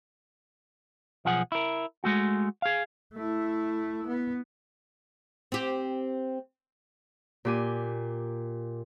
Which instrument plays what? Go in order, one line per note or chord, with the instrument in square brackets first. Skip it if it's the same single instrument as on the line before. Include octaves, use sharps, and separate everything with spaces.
[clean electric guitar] B1 F3 G#4 F#5
E4 A#4
G#3 A3 F#4
G#4 F5
[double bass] A3 E4
B3
[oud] C4 G4
[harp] A#2 G4 G#5